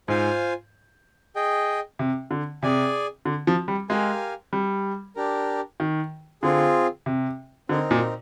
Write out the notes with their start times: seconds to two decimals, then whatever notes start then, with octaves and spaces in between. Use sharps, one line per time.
0.08 G#2 F4 C5 F5 G#5
1.36 G#4 D#5 G5
1.99 C3
2.31 D3
2.63 C3 G#4 D5 G#5
3.25 D3
3.47 F3
3.68 G3
3.89 G#3 G4 A#4 F5 G#5
4.53 G3
5.16 D4 G4 A#4
5.80 D#3
6.43 D3 C4 F4 G#4
7.06 C3
7.69 D3 C4 D#4 A#4
7.91 A#2